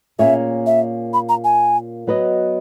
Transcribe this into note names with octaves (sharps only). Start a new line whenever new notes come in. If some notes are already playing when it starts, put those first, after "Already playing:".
A#2 A#3 C#4 G#4 C#5 E5
E5
B5
A#5
G#5
F#3 B3 F#4 B4 D#5